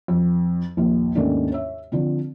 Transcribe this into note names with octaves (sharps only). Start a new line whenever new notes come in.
F2
A#1 D#2
D#2 G#2 D#3 A3 C#4 D4
C#5 E5
D3 F3 C4